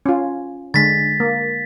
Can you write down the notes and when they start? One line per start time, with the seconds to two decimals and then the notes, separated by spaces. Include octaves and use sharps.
0.06 C#4 F4
0.74 D3 G#3 A6 B6
1.20 A#3